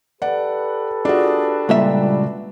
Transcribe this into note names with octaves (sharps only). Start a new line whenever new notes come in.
G4 A4 B4 D5 F#5
D4 F4 F#4 G#4
C#2 A#2 G3 E5